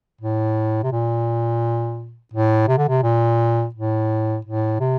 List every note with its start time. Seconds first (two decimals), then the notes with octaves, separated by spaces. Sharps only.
0.21 A2
0.83 C3
0.92 A#2
2.33 A2
2.68 C3
2.78 D3
2.88 C3
3.03 A#2
3.75 A2
4.45 A2
4.80 C3